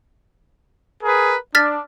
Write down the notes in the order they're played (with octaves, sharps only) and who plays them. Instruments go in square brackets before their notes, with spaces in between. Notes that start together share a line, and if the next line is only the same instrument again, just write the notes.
[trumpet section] G#4 A#4 B4
[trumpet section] D4 [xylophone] F6 A6 B6